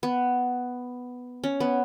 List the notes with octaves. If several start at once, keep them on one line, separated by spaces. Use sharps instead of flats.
B3
C#4
B3